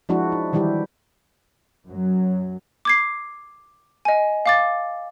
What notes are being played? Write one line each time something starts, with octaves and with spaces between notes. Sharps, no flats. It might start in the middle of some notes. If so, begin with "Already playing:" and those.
F3 G#3 D4 E4 F#4
D#4
D#3 E3 G3 E4 G4
F#2 F#3
D6 G#6 C7
D#5 G#5
F5 D6 A6